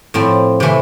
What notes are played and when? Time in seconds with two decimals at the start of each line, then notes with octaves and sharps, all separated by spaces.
0.14 A2 F3 C4
0.60 C3 E3 A3